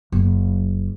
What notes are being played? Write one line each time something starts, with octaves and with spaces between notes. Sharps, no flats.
F#1